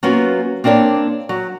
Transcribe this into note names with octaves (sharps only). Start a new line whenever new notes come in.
F#3 A#3 B3 C#4 F4 F#4
A#3 C4 D4 A#4 C#5
F#3